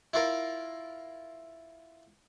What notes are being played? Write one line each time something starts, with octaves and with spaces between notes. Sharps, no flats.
E4 F4 A#4